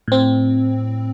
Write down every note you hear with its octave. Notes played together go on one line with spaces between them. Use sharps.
A2 C4